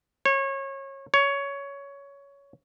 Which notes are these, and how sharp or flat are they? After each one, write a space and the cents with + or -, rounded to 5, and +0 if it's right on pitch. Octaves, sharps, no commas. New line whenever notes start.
C#5 -25
C#5 +15